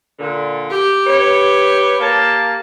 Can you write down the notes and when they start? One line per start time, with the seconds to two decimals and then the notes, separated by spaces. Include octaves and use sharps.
0.19 A#2 D3
0.71 G4
1.07 B4 C#5
2.00 A#3 A5